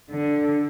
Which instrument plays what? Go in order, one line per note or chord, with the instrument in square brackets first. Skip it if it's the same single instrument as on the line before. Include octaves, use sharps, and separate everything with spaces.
[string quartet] D3